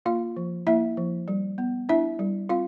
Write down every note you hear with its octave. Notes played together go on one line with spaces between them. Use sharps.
A#3 F4 F5
F3
A#3 E4 E5
F3
G3
B3
D4 E4 E5
G3
C4 F4 F5